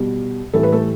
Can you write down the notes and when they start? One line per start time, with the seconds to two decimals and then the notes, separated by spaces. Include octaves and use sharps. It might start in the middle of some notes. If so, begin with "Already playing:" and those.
Already playing: B2 G3
0.53 A2 E3 G3 A4
0.63 B4
0.72 A3 A4